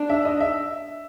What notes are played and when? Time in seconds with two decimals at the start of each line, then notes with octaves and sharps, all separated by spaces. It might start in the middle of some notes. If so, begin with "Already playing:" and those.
Already playing: D4
0.09 E5
0.25 D#5
0.40 E5